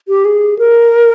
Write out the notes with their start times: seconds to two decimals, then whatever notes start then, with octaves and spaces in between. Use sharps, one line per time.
0.08 G4
0.25 G#4
0.59 A#4